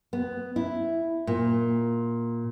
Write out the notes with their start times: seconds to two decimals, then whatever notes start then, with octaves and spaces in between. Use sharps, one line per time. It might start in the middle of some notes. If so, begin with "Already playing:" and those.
0.13 B3
0.56 E4
1.27 A#2